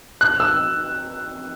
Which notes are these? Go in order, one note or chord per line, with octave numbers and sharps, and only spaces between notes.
F#6
E6